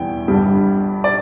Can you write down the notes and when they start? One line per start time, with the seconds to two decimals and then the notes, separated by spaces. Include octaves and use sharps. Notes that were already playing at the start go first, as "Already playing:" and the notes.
Already playing: E2 E3 G3 G5
0.28 G1 G2 G3
1.04 D5